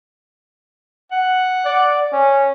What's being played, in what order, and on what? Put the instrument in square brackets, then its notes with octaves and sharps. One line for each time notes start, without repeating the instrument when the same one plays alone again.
[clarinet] F#5
[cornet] D5
C#4